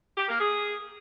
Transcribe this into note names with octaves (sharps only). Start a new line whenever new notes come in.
G4
A#3
G#4